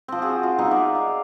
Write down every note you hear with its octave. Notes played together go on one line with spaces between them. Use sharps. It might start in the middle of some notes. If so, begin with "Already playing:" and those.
F3 C4
C4 F#4 G#4
F4
B3 D#4 F4 F#4
A#4 D5 E5
F5